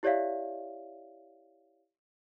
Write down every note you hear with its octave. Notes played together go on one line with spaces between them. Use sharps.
E4 G4 C#5 D5 E5 F5